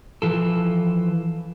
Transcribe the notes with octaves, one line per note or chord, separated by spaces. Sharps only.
E3 F3 A4